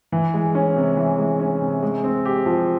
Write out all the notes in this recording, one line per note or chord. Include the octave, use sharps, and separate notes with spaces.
E3
G#3
C#4
C3
E3
G#3
C#4
C3
G#3
C4
G4
F3